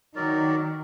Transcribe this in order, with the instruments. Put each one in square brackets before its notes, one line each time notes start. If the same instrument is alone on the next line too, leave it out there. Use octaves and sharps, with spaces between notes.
[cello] D#3 [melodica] F#3 A#4 D5